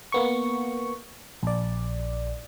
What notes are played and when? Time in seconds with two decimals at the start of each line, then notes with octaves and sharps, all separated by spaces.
0.12 A#3 B3 C#6
1.43 A#1 D5